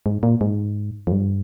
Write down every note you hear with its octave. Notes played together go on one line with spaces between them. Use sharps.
G#2
A#2
G#2
F2
G2